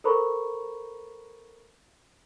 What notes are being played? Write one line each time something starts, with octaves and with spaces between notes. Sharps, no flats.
A4 A#4 C5 A#5 B5 C#6